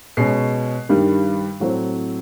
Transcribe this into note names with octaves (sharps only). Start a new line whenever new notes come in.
B2 G#3 C#4 C7
G2 D#3 G3
A2 F#3 A3 C4